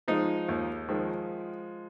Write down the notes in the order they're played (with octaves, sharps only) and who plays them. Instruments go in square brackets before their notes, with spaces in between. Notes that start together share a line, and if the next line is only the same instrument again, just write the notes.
[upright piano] F3 G#3 [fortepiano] D#4
[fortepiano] D#2
[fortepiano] D#3 [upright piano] F3 G#3